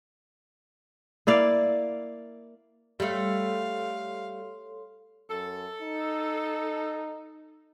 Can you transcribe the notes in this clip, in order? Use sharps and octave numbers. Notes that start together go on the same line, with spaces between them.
A#3 E4 D5 F5
G3 A3 A4 C#5 F5 C6
F#2 A4
D#4